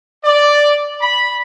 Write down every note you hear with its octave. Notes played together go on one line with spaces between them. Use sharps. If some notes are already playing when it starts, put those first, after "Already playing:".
D5
B5